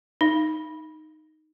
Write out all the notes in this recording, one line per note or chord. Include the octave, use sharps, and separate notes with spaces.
D#4